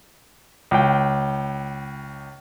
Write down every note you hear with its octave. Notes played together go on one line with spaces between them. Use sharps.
C#2 G5